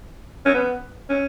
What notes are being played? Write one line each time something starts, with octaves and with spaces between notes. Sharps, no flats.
C#4
B3
C#4